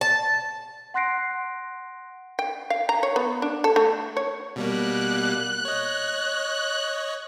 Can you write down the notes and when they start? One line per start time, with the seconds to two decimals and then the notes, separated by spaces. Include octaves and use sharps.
0.01 A5
0.94 F#5 C6 F#6 A#6 C7 D7
2.39 G5
2.70 F5
2.89 A#5
3.03 C#5
3.16 B3
3.42 D4
3.64 A4
3.76 A3
4.17 C#5
4.56 B2 G3 A#3 F#6
5.65 C#5 D#5